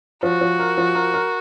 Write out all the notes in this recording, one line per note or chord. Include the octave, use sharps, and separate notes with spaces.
F3 F#4
F3
A#4
F3
A#4
A#4